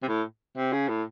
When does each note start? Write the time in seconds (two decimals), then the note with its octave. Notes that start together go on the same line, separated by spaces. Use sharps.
0.03 C3
0.08 A2
0.57 C3
0.73 C#3
0.88 A2